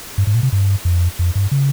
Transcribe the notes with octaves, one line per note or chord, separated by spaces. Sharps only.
G2
G#2
A#2
C3
G2
F2
F2
G2
C#3